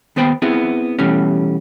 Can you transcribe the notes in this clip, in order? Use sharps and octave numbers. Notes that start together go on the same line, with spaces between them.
D#2 B3 C5 G5 B5
B3 C4 E4 G#4
B2 E3 G3 A3 C#4